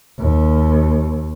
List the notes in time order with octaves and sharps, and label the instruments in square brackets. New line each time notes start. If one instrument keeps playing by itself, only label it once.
[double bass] D#2